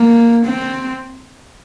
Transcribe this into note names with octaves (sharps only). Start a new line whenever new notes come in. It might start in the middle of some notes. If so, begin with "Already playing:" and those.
Already playing: A#3
C4